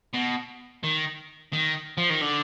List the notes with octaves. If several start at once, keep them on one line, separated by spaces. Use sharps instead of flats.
B2
D#3
D#3
F3
D#3
D3